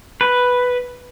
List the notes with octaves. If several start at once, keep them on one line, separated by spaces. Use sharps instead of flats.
B4